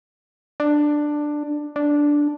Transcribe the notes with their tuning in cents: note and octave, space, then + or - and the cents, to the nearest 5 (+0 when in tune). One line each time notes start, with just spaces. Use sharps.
D4 +10
D4 -5